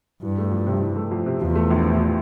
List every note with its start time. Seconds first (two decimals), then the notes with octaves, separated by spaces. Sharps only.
0.22 G2 E3
0.38 A3
0.52 F2
0.66 C3
0.82 E3
0.96 A3
1.11 F2
1.26 C3
1.41 E2 F3
1.56 A3
1.70 A#1
1.86 A2
2.00 F3